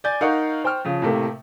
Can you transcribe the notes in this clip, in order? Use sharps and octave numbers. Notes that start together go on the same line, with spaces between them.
D5 G#5 G6 A6
D#4 A#4 F5 F#5 C#6
C5 G5 C#6 F6
C#3 F3
A2 C3 A3 A#3